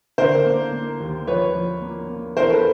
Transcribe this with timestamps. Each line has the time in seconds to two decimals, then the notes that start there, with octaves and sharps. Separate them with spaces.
0.18 D3 A#4 C5
0.46 A#3
0.73 A#3
1.00 D#2
1.27 F3 B4 C#5
1.55 F3
1.82 A#3
2.09 A#3
2.36 E2 A#4 C5
2.50 A4 B4